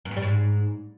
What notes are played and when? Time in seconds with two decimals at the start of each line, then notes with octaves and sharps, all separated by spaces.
0.05 F#2
0.11 G2
0.17 G3
0.22 G#2